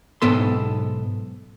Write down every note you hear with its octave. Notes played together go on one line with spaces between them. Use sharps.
B1 G#2 B3 A4 C6